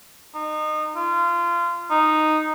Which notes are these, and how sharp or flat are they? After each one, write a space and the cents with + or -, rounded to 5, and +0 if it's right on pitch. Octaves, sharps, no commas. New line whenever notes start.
D#4 -25
F4 -25
D#4 -5